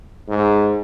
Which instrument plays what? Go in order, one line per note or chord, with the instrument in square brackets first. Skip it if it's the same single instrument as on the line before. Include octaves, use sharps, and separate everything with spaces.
[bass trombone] G#2